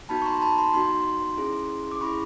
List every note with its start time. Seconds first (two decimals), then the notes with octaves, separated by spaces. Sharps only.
0.09 B3 D#4 F#4 A5 B5
0.22 C#6
0.26 A#5 C6
0.42 A5 B5
0.58 A#5 C6
0.74 B3 D#4 F#4 A#5 C6
1.37 C#4 E4 G#4
1.92 D6
2.01 C#4 E4 G#4 B5 C#6